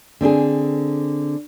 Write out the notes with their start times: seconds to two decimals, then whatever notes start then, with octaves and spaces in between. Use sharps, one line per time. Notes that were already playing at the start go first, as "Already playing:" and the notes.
0.21 D3 C4 D4 G#4